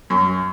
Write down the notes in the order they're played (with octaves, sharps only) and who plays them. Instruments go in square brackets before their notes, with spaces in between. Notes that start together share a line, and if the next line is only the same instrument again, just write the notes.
[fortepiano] F#2